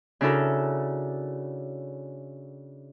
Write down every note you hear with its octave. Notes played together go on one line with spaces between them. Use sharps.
C#3 D4 E4 F#4 A4 A#4